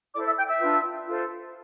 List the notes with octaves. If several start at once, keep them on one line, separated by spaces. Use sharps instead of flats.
E4 A4 C5 D5 D6
E5 E6
G5 G6
E5 E6
D4 F4 B4
F4 A4 C5